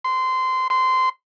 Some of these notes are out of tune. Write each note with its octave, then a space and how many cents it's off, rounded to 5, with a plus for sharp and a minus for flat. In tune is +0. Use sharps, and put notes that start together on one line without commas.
C6 -20
C6 -20